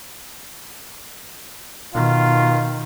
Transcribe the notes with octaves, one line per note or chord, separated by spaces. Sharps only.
B2 D#3 F4